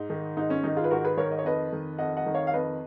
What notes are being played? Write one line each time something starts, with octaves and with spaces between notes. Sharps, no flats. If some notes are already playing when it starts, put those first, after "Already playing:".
Already playing: G#2 D#4
D#3
G#2 D#4
C#4
D#3 D#4
F4 G#4
B4
G#2 F#4 A#4
G#4 B4
D#3 A#4 C#5
D#5
C#5
F2 B4 D#5
D#3
F2 D#5 F#5
D#5 F#5
D#3
C#5 F5
F5
F2 B4 D#5